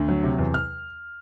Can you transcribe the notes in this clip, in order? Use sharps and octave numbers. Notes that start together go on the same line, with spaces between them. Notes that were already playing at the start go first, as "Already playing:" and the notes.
Already playing: D2
F#3
C3
E2
F6